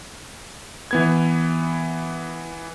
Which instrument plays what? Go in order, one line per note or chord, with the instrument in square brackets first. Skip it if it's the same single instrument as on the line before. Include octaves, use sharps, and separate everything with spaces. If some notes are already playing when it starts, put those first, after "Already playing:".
[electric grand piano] E3 B3 G#6